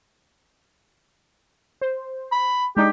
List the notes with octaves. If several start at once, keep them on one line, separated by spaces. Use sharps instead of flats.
C5
B5
G#3 D4 D#4 G4